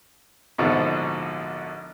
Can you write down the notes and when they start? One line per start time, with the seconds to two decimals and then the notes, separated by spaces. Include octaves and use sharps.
0.58 A#1 G#2 B2 D3 F3